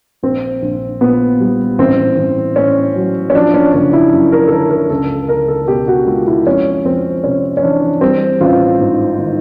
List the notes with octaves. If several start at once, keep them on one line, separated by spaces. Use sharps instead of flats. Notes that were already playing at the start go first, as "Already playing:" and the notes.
A#1 C4
A#1
A#2 B3
G3
A1 C4
A1
A2 C#4
F#3
C#4
F3 D4
C#4
F#1 D4
E4
F#2
A#4
A4
D3 A#4
A#4
C#2 A4
C#2 A#4
A4
B2 G4
F#4
G#3 F4
E4
F2 C#4
F2 C4
C3 C#4
C#4
E3 D4
G3 C4
A1 F4
G#2
D#3